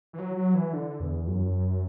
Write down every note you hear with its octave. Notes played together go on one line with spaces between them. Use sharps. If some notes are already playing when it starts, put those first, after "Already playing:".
E3
F#3
F#3
E3
D3
E2
F#2